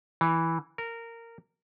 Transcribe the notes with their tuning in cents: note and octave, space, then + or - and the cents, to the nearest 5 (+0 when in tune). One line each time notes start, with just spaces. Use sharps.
E3 -5
A#4 -15